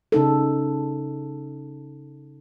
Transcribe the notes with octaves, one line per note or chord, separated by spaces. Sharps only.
C#3 D#4 A4